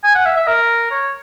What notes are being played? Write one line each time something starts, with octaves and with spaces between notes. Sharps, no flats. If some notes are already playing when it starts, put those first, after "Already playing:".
G#5
F#5
E5
E5
A#4
C#5